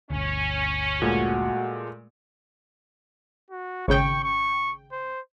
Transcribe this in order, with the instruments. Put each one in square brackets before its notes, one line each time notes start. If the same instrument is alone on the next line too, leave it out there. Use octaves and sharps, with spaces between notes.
[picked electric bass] G1 D2 [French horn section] C#4
[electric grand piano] A#2 G#3 A3 [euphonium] F#4
[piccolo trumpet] F#4
[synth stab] G#1 C#3 G5 [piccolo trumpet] C#6
[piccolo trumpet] C#6
C5